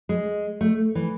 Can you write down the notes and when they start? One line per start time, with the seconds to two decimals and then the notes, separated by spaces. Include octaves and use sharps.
0.09 G#3
0.61 A3
0.95 E3